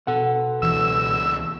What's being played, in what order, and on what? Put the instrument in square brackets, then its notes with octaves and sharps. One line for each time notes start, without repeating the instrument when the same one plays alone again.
[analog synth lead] B2 [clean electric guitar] A4 F#5
[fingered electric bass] C#2 E3 [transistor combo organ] E6